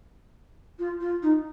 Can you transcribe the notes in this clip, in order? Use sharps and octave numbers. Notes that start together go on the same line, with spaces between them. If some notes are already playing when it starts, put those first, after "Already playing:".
F4
F4
D#4